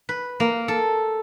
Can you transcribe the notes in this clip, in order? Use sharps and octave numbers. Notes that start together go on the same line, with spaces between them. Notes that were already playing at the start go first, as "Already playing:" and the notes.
B4
A#3
A4